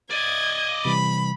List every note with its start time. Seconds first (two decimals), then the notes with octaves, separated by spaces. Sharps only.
0.11 D5 D#5 G#6
0.85 C3 E3 G3 B5